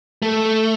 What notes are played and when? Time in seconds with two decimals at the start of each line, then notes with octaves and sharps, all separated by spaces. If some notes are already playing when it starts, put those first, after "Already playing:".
0.22 A3